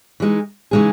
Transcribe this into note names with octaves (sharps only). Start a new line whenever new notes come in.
E3 G#3 D#4
C#3 E3 G#3 D#4 G#4